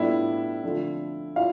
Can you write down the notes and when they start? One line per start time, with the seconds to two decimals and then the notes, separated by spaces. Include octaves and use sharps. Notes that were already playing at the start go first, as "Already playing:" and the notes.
Already playing: A2 G3 B3 D4 E4 F4 E5
0.63 D3 F3 A3 C4 F4
1.36 E4 F4 F5